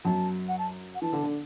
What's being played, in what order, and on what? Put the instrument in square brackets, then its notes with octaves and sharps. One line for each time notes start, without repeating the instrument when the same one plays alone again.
[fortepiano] F#2 F#3 [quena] A5
[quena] F#5
A5
F#5
[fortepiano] E3 [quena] A5
[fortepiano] D3
D3